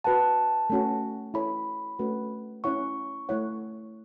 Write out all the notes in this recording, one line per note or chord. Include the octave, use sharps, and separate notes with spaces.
F#4 B4 F#5 A5
A3 C#4 F#4
E4 A4 C#5 B5
A3 C#4 F#4 B4
C#4 E4 C#5 F#5 C#6
A3 E4 C#5 F#5